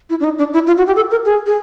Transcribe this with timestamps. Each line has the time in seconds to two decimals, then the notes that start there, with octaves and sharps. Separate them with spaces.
0.10 E4
0.20 D4
0.24 D#4
0.38 D4
0.54 E4
0.67 F4
0.78 F#4
0.87 G4
0.96 A4
1.11 A#4
1.25 G#4
1.46 G#4